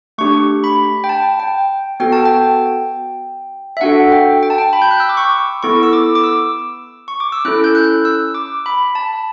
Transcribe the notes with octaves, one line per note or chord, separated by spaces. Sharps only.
A3 D4 G4 C#6
B5
G5
A5
G5
B3 F#4 A4 G5
A5
G5
E5
D4 F#4 A4 F#5
G5
G5
A5
G5
B5
G6
F#6
E6
D6
C#6
B3 E4 A4 C#6
E6
D6
D6
E6
C#6
D6
E6
C#4 E4 A4 F#6
G6
F#6
E6
D6
B5
A5